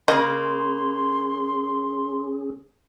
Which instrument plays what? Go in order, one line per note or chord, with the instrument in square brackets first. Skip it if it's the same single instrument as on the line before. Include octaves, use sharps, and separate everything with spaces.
[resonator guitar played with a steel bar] C#3 A#3 [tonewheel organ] C#4 G#4 [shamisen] D#5 [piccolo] C6